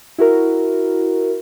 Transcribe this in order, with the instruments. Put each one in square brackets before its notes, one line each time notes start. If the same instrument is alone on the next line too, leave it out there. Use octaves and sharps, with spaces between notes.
[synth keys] E4 F#4 A#4